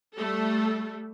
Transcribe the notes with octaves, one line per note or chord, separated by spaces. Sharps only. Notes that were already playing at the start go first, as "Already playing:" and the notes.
G3 A3 A4